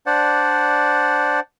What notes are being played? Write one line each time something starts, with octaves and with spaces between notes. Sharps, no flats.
D4 C5 D5 F#5